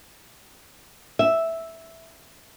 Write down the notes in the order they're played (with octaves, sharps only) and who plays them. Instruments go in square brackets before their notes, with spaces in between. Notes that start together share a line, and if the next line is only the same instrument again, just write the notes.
[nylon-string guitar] E5